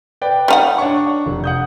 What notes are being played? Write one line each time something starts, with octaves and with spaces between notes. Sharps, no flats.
B4 D5 G5
G3 D#4 F#5
D4 C#5 C#6
F1
F#5 D#6 G6